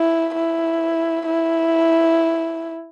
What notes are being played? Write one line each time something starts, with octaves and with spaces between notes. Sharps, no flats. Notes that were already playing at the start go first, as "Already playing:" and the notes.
Already playing: E4
E4
E4